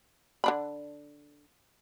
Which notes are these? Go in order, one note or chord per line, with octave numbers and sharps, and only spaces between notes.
D3 D4 B5